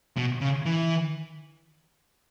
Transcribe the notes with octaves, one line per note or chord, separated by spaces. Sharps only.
B2
C#3
E3